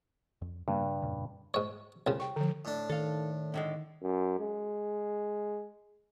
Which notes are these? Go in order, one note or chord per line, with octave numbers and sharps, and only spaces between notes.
F2
G2 C#3 G3 A#3
C#3
F2 A#2 C#3
G#2 C#5
C2 C#3
G5 C#6
D3 F3
A2 D4
D#3 A4 F5
A2 D3 G#3
F#2
G#3